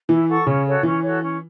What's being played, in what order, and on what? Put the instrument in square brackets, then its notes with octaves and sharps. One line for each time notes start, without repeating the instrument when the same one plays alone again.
[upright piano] E3 [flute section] E4
[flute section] A4 F#5 C#6
[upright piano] C#3 [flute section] C#4
[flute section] F#4 A4 C#5
[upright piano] E3 [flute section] C#4
[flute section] F#4 A4 C#5
C#4